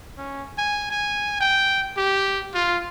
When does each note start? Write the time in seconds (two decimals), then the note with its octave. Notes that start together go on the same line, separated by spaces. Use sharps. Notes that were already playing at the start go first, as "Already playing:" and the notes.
0.18 C#4
0.58 G#5
0.91 G#5
1.40 G5
1.97 G4
2.54 F4